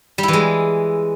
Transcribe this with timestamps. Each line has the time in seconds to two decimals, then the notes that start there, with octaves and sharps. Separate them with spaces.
0.18 G3
0.23 E4
0.28 E3
0.33 G#3